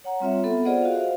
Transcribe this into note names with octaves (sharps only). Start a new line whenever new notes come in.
C#5 F#5 A#5
G3 C4 F4 C#5 E5
B3 A4
F4 G#4 C5 D5 D#5 F#5
F#4 F5
C5 E5 F5